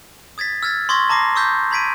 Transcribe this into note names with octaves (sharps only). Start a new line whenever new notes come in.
D#6 G#6 A6 B6
E6 F6 G#6 A6 B6
C6 C#6 D#6 G#6 A#6
A5 A#5 D6 A#6 C7
C#6 D#6 E6 G6 B6
A#5 B5 G#6 B6 D7 D#7